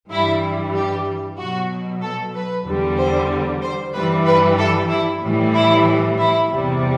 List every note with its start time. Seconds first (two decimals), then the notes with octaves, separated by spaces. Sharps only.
0.11 G2 E3 G3 E4
0.74 G4
1.38 B2 F#3 F#4
2.02 A4
2.35 B4
2.66 E2 D3 G3
2.98 C5
3.62 C5
3.94 G2 E3 G3 B4
4.26 B4
4.58 A4
4.90 E4
5.22 A2 E3 G3
5.54 E4
6.18 E4
6.50 E2 C3 G3